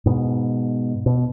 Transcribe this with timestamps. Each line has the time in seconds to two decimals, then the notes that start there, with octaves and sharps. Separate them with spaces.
0.06 G#2 B2
1.06 B2